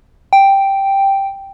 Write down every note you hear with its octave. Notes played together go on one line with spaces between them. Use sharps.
G5